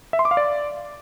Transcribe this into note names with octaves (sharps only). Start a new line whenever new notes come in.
E5
C6
D6
F5
D5